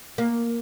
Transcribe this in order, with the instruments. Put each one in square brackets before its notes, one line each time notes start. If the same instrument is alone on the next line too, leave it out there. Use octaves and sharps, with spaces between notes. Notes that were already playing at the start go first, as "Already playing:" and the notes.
[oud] A#3